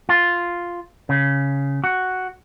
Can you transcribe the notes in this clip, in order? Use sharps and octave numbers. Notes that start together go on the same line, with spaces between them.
F4
C#3
F#4